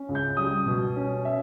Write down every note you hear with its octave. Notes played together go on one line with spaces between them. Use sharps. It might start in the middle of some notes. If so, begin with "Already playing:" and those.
Already playing: C#4
C#2
G6
G3 D#6
B2
C#4
E5